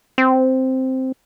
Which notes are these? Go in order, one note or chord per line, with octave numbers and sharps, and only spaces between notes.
C4